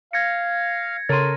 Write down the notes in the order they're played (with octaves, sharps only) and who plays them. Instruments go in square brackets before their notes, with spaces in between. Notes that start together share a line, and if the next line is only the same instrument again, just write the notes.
[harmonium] F5 [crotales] G#6 A#6 C#7
[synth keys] C#3 C6 [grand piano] A4 A#4 C#5 [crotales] A6 D#7